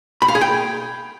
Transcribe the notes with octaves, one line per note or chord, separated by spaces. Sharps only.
B5
F5
G#4
G5